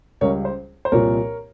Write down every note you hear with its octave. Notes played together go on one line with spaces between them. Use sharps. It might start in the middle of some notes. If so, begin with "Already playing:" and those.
C#2 C#3 G3 A#4 C#5
C5
C5
C2 A#2 F3 A#4 C#5